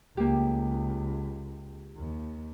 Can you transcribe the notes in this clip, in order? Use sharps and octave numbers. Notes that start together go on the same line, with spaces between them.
C#2 A#3 G4
D#2